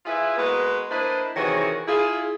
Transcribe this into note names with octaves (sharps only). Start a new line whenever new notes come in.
E4 F4 G#4 B4 E5
G#3 A#3 B3 F#4 B4
A#3 D4 E4 B4 C5 D#5
C3 D#3 E3 F#4 G#4 C#5
E4 F4 G#4